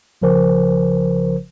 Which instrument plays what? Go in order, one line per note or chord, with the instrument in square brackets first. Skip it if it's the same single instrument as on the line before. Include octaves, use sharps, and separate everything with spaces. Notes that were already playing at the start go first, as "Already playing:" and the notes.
[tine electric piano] G#1 C#3 F3 A#4 C5